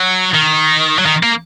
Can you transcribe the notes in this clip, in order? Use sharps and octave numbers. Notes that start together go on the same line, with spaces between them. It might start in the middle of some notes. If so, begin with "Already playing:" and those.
Already playing: F#3
D#3
F#3
D#3
A#3